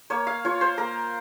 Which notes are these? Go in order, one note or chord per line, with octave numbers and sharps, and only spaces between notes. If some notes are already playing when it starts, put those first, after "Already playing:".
A#3 C#5
F5
F4 C#5
C5
A#3 A#4